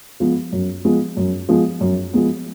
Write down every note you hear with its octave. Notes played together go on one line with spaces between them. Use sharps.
F3 G#3 B3
F#2
F3 G#3 B3
F#2
F3 G#3 B3
F#2
F3 G#3 B3